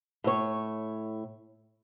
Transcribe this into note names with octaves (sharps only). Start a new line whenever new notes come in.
A2 C#5